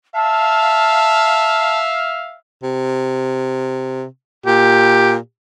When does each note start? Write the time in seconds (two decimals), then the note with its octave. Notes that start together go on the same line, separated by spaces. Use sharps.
0.14 E5 F5 A5
2.63 C3
4.46 A#2 G4